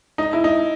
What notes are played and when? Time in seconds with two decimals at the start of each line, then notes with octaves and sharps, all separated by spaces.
0.18 D#4
0.33 E4
0.44 D#4